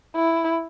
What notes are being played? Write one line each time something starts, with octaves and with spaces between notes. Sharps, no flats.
E4